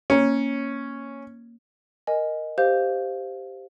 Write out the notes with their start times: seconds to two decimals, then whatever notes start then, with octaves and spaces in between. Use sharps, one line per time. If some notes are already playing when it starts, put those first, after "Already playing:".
0.10 A#3 C#4 C#5
2.07 A#4 D#5 G#5
2.58 G4 C5 F5 G6